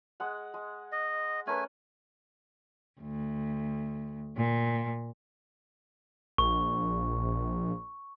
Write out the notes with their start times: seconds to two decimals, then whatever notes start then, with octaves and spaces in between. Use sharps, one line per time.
0.20 G#3 F#5
0.54 G#3
0.92 D#5
1.47 A3 C#4 A#4 B4 G#5
3.01 D2
4.37 A#2
6.38 A#1 C#6